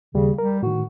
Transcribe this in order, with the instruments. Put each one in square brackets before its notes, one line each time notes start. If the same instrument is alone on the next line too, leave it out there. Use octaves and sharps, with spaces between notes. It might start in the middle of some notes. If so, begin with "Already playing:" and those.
[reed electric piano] D#2 G3 [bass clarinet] C#3
[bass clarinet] G3 [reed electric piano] A#4
[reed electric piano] A2 D#3 [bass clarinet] F#4